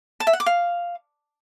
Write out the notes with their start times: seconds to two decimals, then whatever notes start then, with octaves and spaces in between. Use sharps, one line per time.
0.20 A5
0.27 E5
0.33 F#5
0.40 D6
0.46 F5